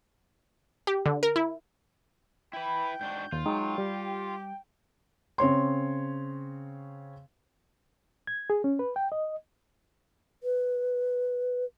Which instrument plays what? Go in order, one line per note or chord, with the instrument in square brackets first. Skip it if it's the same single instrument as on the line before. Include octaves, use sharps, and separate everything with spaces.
[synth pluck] G4
D3
A#4
E4
[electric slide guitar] E4 B4 [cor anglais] G5 [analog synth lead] B5
[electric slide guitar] G#2 D4 F#4 [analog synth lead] G6
[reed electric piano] D#2 [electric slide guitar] F4
[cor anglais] F#3 [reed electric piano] G#3 D#4 [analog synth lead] G5
[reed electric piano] G3 [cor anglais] G4
[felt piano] C#3 C4 C#5 C6
[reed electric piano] G#6
G#4
C#4
B4
G5
D#5
[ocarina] B4